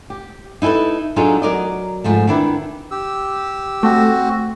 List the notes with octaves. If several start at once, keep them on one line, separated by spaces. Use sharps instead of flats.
G4
D#4 E4 G#4 A4 B4
F#3 D4 D#4 F4 G#4 A4
F#3 A#4 D5 D#5
G#2 F3 A3
D#3 D4 E4 B4
G4 E6
A3 C4 F#4